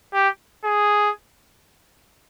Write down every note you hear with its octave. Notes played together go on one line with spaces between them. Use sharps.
G4
G#4